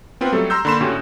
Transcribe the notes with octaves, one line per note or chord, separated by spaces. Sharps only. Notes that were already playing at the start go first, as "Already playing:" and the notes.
B3 C4 F4 B4
F#3 G3 A3 A4
A#5 C6 E6 G6
D3 A#3 B5 C6 E7
A2 D3 C#4 F#4 G4